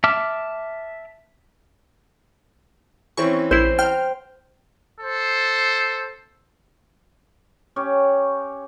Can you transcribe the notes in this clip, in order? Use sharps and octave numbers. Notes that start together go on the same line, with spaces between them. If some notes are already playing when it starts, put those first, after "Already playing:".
E5 A5 D6 F6
E3 C4 C#4 C#6
A#1 E4 C5
G5 F6
A4 C5
C#4 G4 C#5